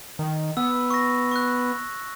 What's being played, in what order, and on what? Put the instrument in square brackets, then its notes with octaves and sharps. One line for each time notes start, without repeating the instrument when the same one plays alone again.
[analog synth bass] D#3
[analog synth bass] B3 [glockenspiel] E6
[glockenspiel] C#6 A#6
C#6 F#6